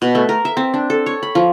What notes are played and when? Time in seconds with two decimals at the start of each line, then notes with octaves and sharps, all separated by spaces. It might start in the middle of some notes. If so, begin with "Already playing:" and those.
0.02 B2
0.15 A3
0.29 A#4
0.45 E5
0.57 C4
0.74 D4
0.90 A4
1.06 C#5
1.23 B5
1.35 F3